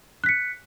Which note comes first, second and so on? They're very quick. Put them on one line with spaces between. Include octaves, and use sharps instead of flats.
F#6 B6 C#7